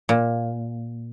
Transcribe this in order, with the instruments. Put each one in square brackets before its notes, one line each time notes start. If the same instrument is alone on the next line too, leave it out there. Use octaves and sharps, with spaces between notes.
[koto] A#2